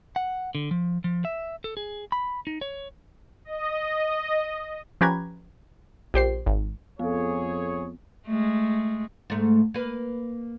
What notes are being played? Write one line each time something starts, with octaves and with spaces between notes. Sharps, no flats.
F#5
D3
F3
F3
E5
A4
G#4
B5
D#4
C#5
D#5
F3 C#4 G4 B4 A#5 G#6
A#1 G4 C5 C7
G#1
F2 B3 G#4 A4 C#5 F5
G#3 A3
G#2 A3
A#3 B4